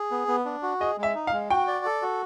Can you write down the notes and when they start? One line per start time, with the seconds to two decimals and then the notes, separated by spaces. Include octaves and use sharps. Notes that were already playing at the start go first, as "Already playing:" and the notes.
Already playing: G#4
0.11 B3
0.28 B3
0.45 D4
0.63 F#4
0.80 G#4 D#5
0.98 G#3
1.03 E5
1.15 D#4
1.27 F5
1.32 G#3
1.50 F#4 G5
1.67 D5
1.85 A4
2.02 F#4